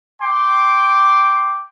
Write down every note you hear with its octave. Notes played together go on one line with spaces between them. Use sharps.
G5 C6 D6